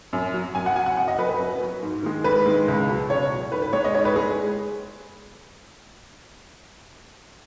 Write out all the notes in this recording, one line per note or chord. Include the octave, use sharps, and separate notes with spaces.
F#2
F#3
F#2 G#5
F#5
F#3 G#5
F#5
F#2 F#5
D#5
F#3 B4
B4
F#2
F#3
G#2
D#3 G#3
G#2 B4
D#3 G#3
C#2
B2 F#3
C#2 C#5
B2 F#3
G#2 B4
B4
G#3 C#5
D#5
G#2 C#5
B4
G#3 G#4